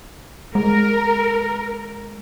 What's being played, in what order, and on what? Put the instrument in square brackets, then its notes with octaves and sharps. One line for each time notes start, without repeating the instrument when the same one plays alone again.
[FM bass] G#3 [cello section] A#4